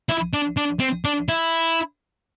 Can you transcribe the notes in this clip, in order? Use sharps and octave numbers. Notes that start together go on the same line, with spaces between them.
E4
D4
D4
C4
D4
E4